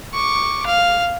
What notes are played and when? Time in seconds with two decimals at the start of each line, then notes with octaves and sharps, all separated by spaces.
0.13 C#6 D6
0.66 F5